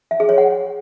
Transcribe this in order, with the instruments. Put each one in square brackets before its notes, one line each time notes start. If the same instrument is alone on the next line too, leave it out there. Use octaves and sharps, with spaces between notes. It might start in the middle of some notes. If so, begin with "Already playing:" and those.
[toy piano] E5
G#4
C#5
F#5